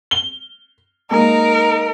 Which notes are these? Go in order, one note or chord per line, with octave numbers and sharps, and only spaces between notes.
G7
G#3 A#3 D#4 A#4